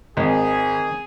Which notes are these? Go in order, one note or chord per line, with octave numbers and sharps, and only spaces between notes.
G#1 D#3 G#3 G#4